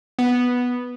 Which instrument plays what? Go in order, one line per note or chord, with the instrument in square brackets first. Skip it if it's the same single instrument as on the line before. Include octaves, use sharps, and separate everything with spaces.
[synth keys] B3